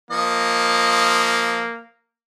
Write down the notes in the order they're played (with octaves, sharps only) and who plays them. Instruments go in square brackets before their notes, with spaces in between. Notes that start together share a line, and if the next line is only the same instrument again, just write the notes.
[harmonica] F3 D#5 [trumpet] A#3